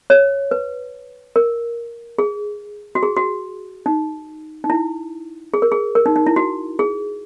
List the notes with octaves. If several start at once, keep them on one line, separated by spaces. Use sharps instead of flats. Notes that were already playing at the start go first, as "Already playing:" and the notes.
C#5
B4
A#4
G#4
F#4
G#4
F#4
D#4
D#4
E4
G#4
A#4
G#4
A#4
D#4
D#4
E4
F#4
G#4